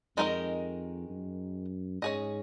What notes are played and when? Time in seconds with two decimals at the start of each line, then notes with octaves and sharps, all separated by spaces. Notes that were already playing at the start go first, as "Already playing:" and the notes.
0.16 F2 D#3 G#3 D#4 A#4 D#5
1.10 F#2
2.02 G#2 C#4 G#4 D#5